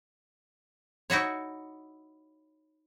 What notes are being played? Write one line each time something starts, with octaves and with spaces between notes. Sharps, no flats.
D#4 E4 F#4 C#5